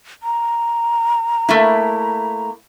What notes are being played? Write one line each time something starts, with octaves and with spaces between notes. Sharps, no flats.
A#5
A3 A#3 E4